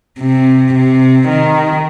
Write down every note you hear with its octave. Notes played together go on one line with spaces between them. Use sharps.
C3
C3
D#3